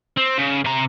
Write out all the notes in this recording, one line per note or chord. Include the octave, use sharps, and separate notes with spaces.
C4
C#3
C3 A#5